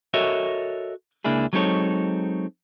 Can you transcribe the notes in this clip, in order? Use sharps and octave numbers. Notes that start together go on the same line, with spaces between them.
F#4 A4 A#4 C#5 D#5 E5
C#2 A#3 D4 E4 G#4
F#3 G#3 C4 D#4 A4 C#5